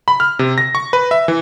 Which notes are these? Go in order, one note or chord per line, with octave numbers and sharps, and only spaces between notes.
B5
F6
C3
A#6
C#6
B4
E5
E3